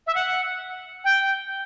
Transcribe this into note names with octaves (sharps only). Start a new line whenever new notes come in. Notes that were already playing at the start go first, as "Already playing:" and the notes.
E5
F#5
G5